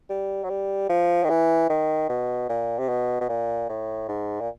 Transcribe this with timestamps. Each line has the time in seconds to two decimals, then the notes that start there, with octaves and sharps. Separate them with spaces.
0.10 G3
0.44 F#3
0.50 G3
0.89 F3
1.24 D#3
1.30 E3
1.70 D#3
2.09 B2
2.49 A#2
2.79 C3
2.89 B2
3.21 B2
3.29 A#2
3.69 A2
4.08 G#2
4.41 A#2